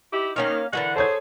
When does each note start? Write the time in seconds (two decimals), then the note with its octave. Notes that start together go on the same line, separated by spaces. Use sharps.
0.12 D#4 E4 G4
0.36 D#3 A#3 C#4 F5
0.73 D3 E3 G#3 A#4 B4 F#5
0.96 G#4 A4 C5 C#5 G#6